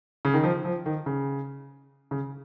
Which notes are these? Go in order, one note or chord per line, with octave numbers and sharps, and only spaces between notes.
C#3
D#3
F3
F3
D#3
C#3
C#3